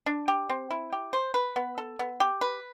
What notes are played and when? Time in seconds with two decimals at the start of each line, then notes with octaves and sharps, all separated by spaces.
0.06 D4
0.28 G4
0.49 C4
0.70 E4
0.92 G4
1.13 C5
1.34 B4
1.56 B3
1.78 A4
1.99 B3
2.20 G4
2.41 B4